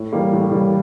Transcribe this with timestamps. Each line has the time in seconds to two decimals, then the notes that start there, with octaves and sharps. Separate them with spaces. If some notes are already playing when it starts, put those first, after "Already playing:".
Already playing: A2
0.13 E3 G3 A#3
0.33 A2
0.51 E3 G3 A#3